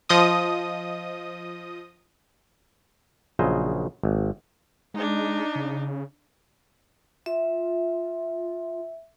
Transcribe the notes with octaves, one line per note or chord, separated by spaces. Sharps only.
F3 D#5 D#6
A#1 C#3 F#3 C5 D#5
G#1
G#3 D4 D#4
C#3
F4 E5